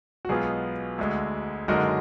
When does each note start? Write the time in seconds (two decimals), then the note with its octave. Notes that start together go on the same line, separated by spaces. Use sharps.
0.25 F#4
0.29 B1 B2 G#3 B3 F4 G#4
0.98 D2 D3 G#3
1.68 F#1 F#2 D3 G#3 D#4 F#4 A#4